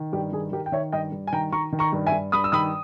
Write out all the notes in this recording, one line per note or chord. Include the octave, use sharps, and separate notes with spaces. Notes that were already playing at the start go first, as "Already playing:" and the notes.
Already playing: D#3
G2 G4
D#3 G#4
D#3 G4 A#4
G5
D#3 C#5 E5
G2 D#5 G5
G2
G#5
D#3 G5 A#5
D#3 A#5 C#6
D#3
A#5 C#6
G2
E5 G#5
G2
G2 B5 D#6
E6
D#3 B5 D#6